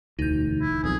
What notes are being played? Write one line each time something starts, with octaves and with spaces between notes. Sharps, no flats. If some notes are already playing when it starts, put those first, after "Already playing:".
E1 D2 D#4 G6
E4
B1 F2 G#4